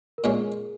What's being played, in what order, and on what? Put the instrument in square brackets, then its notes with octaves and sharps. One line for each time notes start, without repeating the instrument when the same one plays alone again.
[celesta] A#4
[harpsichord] A#2 G#3 C#4 [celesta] G#4